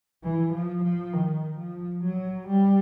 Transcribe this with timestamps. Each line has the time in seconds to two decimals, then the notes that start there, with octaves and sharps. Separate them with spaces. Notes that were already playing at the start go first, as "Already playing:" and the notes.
0.24 E3
0.54 F3
0.84 F3
1.14 D#3
1.59 F3
2.04 F#3
2.48 G3